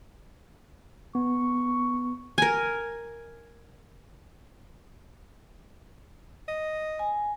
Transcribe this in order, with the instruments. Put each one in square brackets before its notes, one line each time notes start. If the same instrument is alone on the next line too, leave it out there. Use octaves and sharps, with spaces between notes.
[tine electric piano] B3 [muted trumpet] C#6
[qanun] A#4 G#5
[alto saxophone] D#5
[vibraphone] G#5